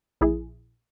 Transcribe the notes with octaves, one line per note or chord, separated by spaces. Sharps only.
A#1 E4 G#4